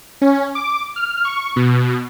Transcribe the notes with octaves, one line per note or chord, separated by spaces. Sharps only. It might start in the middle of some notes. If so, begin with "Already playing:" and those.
C#4
D6
F6
C#6
B2